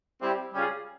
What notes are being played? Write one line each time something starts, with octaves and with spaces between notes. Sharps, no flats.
G3 C4 E4 G4
C#3 G3 C#4 F4 G#4